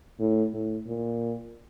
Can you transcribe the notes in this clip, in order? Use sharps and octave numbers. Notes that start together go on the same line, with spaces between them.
A2
A2
A#2